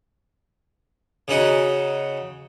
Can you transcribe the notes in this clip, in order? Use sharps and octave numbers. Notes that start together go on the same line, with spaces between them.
C#3 D#4 F#4